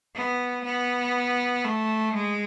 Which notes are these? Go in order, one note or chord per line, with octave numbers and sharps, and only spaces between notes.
B3
B3
A3
G#3